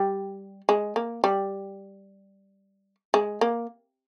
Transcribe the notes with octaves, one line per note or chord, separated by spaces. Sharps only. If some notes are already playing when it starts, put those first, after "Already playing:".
Already playing: G3
G#3
A#3
G3
G#3
A#3